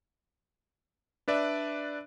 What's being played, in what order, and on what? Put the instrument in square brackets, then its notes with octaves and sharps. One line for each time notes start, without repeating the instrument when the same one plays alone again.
[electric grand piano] D4 B4 D5 E5